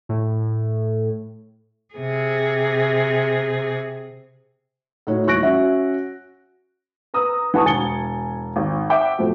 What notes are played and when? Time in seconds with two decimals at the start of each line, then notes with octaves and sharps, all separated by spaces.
0.09 A2
1.94 C3 G#4
5.07 A2 D#4 F#4 C#5
5.26 D#1 E3 C#6 F#6 A#6 D7
5.43 C#4 F#4 E5
7.14 B4 A#5 D#6 E6
7.54 E3 F#5 A5 C#6 D#6
7.65 E1 G#5 A6 C#7 G7
8.56 G#1
8.90 E5 F#5 G5 D6
9.19 F2 B2 F3 F#3 A3